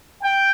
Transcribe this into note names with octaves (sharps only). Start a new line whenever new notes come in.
G5